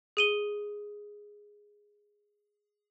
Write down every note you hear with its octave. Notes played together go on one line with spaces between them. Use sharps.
G#4 D#7 G7